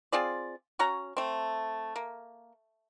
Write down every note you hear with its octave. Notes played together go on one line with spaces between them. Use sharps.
C4 F4 G#4 D5
C#4 F#4 C#5 A#5
A3 C4
A#3